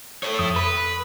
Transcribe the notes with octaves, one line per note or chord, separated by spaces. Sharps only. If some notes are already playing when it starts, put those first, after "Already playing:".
A4 C#5
F2 D#6
B4 B5